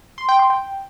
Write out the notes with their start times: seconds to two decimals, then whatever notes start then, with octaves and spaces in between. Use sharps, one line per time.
0.18 C6
0.29 G5
0.39 C6
0.50 G5